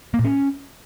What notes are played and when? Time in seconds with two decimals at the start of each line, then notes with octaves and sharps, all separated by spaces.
0.14 A#3
0.19 A#2
0.24 C#4